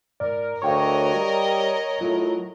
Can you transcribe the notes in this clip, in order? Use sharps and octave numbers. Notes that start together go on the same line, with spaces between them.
G#2 A#4 D5
D2 A#4 C#5 D#5 F5 G5 C#6
G3
A2 F#3 F4